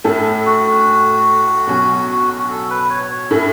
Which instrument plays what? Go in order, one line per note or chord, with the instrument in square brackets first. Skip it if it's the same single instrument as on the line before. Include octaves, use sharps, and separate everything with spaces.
[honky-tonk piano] A2 A3 C#4 A4 [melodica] E5
[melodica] F#4
[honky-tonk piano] B2 F#3 C#4
[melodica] F#4
A4
B4
C#5
C#5
[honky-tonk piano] A2 A3 C#4 E4 [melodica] E5